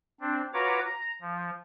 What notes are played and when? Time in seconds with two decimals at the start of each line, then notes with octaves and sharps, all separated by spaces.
0.20 C4 D4
0.54 F4 F#4 B4 C#5 A#5 D6
0.85 A#5
1.22 F3